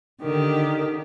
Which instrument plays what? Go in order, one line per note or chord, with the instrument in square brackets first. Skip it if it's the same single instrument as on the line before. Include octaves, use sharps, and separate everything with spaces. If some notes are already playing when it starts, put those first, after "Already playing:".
[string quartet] D3 D#3 G4